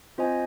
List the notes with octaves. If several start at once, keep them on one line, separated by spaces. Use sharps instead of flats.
C4 F4 C5 D#5 G#5